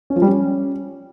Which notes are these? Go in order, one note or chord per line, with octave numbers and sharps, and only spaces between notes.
C#4
F3
G3
C#4